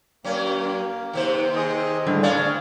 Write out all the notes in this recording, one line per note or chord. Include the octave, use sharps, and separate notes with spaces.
F#2 A#3 C#4
D#2 C3 C5
G#4 D#5
A2 D3 G3 G#4
C#4 D4 D5 F5